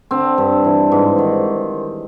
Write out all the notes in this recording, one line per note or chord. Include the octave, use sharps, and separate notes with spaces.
D3 C4
G2
E3
G#2
D#3